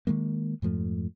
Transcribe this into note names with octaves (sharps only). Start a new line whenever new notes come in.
D#3 E3 G#3 A#3
F2 G#2 F3 A3